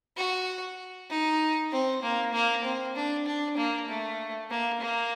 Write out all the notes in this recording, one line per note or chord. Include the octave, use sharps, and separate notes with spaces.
F#4
D#4
C4
A#3
A#3
C4
D4
D4
A#3
A3
A#3
A#3